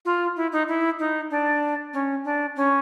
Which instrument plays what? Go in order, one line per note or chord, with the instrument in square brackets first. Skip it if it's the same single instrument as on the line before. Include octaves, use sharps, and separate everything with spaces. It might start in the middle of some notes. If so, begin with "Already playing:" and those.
[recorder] F4
E4
D#4
E4
D#4
D4
C#4
D4
C#4